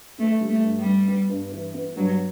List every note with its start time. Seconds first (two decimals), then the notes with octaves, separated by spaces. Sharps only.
0.18 A3 B3
0.41 G3
0.48 A3
0.63 G2
0.78 G3
0.85 B3
1.08 B3
1.30 G2
1.52 E3
1.74 B3
1.96 G2 F#3